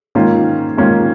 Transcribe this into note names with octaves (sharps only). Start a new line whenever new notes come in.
G#2 D#3 A#3 C#4 F4
G#2 D#3 A#3 C#4 F4